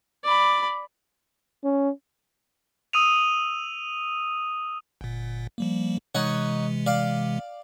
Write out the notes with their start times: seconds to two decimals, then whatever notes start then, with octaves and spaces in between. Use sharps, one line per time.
0.24 D5 B5
1.64 C#4
2.93 D#6 E6 D#7 F7
5.01 G1 A#2
5.58 F3 G3 A#3
6.15 C3 E3 G#3 D#4 C#5 F#5
6.86 D5 F5